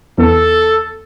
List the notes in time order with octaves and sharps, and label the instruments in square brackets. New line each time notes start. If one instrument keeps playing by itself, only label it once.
[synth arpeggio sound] E2 [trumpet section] A4